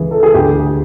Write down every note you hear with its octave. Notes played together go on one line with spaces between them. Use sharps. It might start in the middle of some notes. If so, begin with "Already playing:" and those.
Already playing: C#2 E3 G#4
A4
G#4
D2 G4